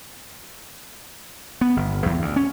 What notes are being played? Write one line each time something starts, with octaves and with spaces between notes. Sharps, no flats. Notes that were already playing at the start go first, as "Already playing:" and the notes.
B3
G1
E2
D2
C#4